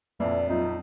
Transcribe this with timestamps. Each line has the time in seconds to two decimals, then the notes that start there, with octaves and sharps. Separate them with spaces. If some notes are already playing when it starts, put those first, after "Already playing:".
0.20 A#1 F2 E3 A#3 D5
0.49 F#3 B3 C4 D#4 F4